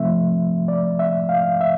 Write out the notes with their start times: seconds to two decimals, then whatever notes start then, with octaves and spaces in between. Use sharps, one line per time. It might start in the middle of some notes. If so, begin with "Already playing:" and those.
Already playing: C3 F3 A3 C4 E5
0.68 D5
0.99 E5
1.29 F5
1.61 E5